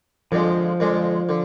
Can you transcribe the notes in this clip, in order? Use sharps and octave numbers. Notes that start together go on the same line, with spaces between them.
F2 D3 F3 G#3
F2 D3 G#3
D3